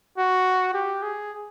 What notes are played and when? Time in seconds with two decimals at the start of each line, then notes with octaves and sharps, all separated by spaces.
0.17 F#4
0.74 G4
1.02 G#4